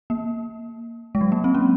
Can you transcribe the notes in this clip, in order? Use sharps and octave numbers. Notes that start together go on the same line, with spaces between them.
A#3
G#3
F#3
A#3
C4
C#4